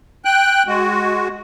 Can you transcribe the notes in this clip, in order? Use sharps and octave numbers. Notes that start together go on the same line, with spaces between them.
G5 F#6
G#3 F#4